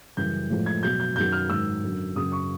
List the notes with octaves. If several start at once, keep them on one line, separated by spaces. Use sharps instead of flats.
F#2 C#3 E3 G3 G6
A2 F3 G#3
G#6
B2 F#3 G6
G6
F#2 D#3 F#3 G6
F6
G#2 D#3 F#3 E6
F#2 D3 F#3
F#2 C#3 F#3 D#6
C#6